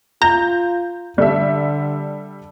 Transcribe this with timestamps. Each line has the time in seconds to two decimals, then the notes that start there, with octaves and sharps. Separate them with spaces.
0.22 F4 A#5 G6
1.18 D3 G3 A4 E5